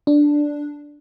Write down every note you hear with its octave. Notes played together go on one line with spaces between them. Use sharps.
D4